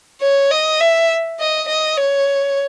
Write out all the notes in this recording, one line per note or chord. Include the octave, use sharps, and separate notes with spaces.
C#5
D#5
E5
D#5
D#5
C#5